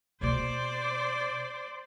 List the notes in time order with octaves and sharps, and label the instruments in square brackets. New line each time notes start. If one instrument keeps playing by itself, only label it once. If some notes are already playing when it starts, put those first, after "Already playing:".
[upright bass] B2 A#3 [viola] C5 D5